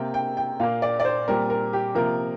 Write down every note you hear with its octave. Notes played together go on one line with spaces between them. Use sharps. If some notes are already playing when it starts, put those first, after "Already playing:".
Already playing: C3 A#3 G5
G5
G5
A#2 A#3 F5
D5
D5
C5
A#2 G3 C4 A#4
A#4
G4
C3 F3 A#3 A#4